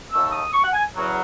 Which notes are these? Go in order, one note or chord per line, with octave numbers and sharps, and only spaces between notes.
D#2 D#3 A3 E6
D#6
C#6
F#5
G#5
E2 C#3 F#3